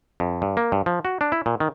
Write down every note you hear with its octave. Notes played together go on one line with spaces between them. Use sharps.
F2
G2
A#3
G2
F3
F#4
D4
E4
A#2
D#3